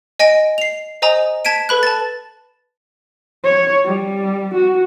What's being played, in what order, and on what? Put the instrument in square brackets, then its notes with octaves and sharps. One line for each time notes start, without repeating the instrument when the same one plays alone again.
[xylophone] D#5 G#5 A#6 D7
C7 F7
C5 D#5 G#5 A#5 D#6
A5 G#6 B6 D7 D#7
A4 B4 B5 F#6
A5 A6
[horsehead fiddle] C#5
G3
F#4